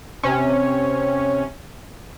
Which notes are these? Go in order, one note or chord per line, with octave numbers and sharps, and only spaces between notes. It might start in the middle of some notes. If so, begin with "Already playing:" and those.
C3 C#4